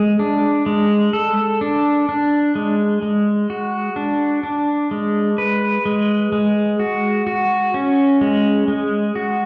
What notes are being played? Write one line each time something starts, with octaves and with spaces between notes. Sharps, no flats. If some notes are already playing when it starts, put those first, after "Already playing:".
Already playing: G#3
D4
G#3
A4
D4
D4
G#3
G#3
F#4
D4
D4
G#3
B4
G#3
G#3
F#4
F#4
C#4
G#3
G#3
F#4